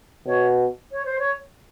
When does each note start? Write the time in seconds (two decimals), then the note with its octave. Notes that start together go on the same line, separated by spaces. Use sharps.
0.26 B2 C#5
0.92 C#5
1.06 C5
1.19 C#5